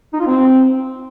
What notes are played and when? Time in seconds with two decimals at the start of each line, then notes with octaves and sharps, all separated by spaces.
0.13 D#4
0.20 F4
0.27 C4